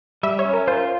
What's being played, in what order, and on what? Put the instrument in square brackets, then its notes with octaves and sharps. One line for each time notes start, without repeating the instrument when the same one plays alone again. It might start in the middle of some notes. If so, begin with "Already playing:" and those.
[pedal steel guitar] G3 [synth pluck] E5
[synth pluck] C#5
[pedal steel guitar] C#4
[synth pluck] A#4
[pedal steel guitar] F4 [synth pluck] C5